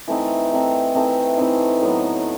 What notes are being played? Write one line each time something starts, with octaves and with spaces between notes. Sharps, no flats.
E3 A3 C4 D#4
E3 A3 C4 D#4
E3 A3 C4 D#4
E3 A3 C4 D#4
A2 F#3 B3